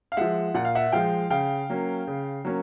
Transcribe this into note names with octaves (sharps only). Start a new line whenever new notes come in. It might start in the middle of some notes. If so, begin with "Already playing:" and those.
F5
F3 G#3 E5 F#5
A#2 F#5
F5
E5 F#5
F3 G#3 F5 G5
C#3 F5 G5
F#3 A#3 C#4
C#3
F#3 A#3 C#4